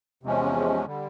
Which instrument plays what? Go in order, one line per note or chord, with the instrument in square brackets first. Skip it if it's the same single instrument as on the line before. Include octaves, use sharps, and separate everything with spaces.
[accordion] E2 C3 F3 G#3 C#4
D3 G3